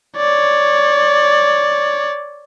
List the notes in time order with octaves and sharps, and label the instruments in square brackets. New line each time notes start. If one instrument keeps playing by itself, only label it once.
[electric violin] C#5 D5